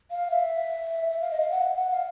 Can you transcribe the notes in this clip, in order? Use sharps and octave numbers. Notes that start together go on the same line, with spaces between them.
F5
E5
E5
F5
D#5
F5
F#5
F#5
F5